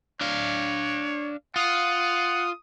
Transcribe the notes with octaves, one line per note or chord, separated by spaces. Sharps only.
D4 C#5 F5
F4 F#5 D#6